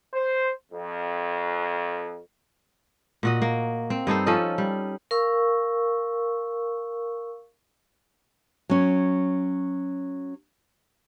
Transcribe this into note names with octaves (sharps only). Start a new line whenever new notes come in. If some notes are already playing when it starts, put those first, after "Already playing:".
C5
F2
A#2 F#4 D#5
A#3
C4
G2 D#4 A4 C5
F3 C#4 A4 D#5
G3
A#4 F5 C#6 E6
F#3 C#4